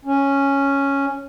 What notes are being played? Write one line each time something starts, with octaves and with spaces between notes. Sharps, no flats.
C#4